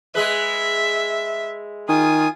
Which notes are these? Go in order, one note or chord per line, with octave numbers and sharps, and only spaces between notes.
G#3 G#4 B4 E5
D#3 F4 G#5 D#6